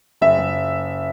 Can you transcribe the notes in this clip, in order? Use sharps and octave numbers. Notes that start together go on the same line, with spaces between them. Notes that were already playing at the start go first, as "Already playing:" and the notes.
F#1 E5
F#1